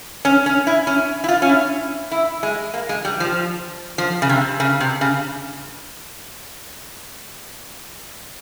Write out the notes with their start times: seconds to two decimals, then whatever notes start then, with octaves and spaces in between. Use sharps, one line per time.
0.25 C#4
0.46 C#4
0.67 E4
0.87 C#4
1.24 E4
1.28 F4
1.42 C#4
1.49 E4
2.11 E4
2.43 G#3
2.74 A#3
2.89 G#3
3.05 G3
3.20 F3
3.98 F3
4.22 C#3
4.29 C3
4.60 C#3
4.80 C3
5.01 C#3